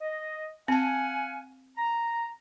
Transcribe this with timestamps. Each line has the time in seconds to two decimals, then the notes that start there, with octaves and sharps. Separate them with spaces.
0.01 D#5
0.68 C4 F5 F#5 G#5 A5
1.77 A#5